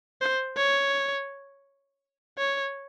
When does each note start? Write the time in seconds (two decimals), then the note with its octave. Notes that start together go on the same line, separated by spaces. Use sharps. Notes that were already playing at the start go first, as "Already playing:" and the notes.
0.21 C5
0.57 C#5
2.38 C#5